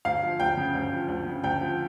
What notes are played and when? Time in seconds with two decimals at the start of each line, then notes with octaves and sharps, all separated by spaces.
0.05 D2 F5
0.23 F3
0.40 D2 G5
0.57 C#3
0.75 D2
0.92 F3
1.08 D2
1.26 C#3
1.44 D2 G5
1.61 F3